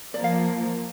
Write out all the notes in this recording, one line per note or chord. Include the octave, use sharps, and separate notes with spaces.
F3 A#3 D5
F5